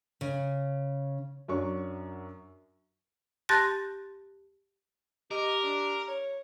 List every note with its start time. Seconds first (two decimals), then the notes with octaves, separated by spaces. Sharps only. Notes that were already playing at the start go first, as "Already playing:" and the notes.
0.21 C#3
1.48 F#2 F#3 D4 C#5 C#6
3.49 G4 A5 C6 F#6 A6 A#6
5.31 G4 A#4 D#5
5.63 D4
6.08 C#5